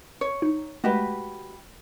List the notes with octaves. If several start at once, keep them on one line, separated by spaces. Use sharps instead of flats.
C#5
D#4
G#3 A3 F#4 G4 B4